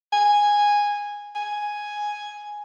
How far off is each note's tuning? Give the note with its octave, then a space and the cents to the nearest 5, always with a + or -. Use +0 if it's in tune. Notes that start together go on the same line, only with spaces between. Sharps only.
G#5 -10
G#5 +0